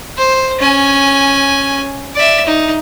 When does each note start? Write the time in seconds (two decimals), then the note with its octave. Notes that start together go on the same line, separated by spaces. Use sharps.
0.17 C5
0.59 C#4 G#5
2.15 D5 E5
2.46 D#4